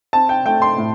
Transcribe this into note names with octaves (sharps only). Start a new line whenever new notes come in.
C4 A5
G5
A3 G5
C6
A2